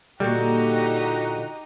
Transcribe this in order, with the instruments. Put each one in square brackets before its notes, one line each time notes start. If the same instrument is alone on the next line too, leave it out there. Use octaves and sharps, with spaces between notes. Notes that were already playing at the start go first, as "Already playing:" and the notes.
[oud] A#2 D3 [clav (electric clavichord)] G3 [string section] D#4 G4 [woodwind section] F#4